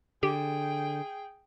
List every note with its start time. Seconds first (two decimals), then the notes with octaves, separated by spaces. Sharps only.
0.23 D3 G4 G#4 G5